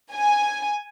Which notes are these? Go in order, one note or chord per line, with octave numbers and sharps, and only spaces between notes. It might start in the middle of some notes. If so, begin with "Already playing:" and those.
G#5